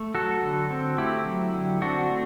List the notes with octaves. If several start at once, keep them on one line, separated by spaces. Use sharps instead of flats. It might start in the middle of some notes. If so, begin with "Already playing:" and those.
Already playing: A3
F#3 F#4 A4
D3
C4
A3 E4 G4
F#3
D3
C4 D4 F#4
A3